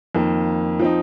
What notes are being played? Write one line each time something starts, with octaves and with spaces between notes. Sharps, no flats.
F2 D#3 A#3
F3 C4 D#4